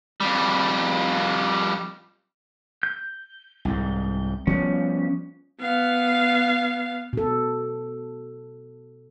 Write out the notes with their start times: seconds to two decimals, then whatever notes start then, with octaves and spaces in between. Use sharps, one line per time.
0.21 F2 G3
2.83 G6
3.65 C2 G#2
4.47 F3 G3 B3 C#4
5.61 B3 F5
7.13 B2 A4